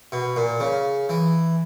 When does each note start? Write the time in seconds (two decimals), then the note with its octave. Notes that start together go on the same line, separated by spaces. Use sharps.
0.12 B2
0.36 A#2
0.60 C#3
1.09 E3